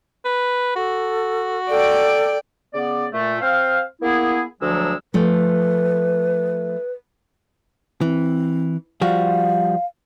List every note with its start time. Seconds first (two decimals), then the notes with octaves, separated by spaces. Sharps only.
0.25 B4
0.76 F#4 A4
1.70 A4 D5 G5
2.74 C#3 B3 D5
3.12 A#2 A3
3.41 C4 C5 F5
4.02 A#3 B3 E4 G#4
4.61 D2 F3 F#3 G#3 E6
5.14 F3 A3 B4
8.01 E3 C4
9.01 F3 G3 F#4 F5